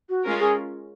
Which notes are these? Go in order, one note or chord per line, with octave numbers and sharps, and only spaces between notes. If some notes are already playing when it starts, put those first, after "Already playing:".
F#4
G#3 C#4 F4 A#4
G#4